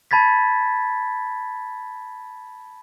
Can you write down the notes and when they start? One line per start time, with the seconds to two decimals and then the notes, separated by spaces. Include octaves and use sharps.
0.11 A5 B5 G#6 A6 B6